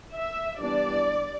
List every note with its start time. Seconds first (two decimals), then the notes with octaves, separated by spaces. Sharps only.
0.14 E5
0.61 E3 G3 B3 D4 D5